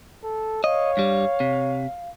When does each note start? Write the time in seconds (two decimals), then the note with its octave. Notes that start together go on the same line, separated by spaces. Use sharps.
0.24 A4
0.64 C#5 D#5 F5
0.97 G2 G3
1.40 C3